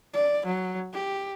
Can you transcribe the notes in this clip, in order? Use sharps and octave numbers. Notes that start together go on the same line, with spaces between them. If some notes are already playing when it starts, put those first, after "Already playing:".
D5
F#3
G4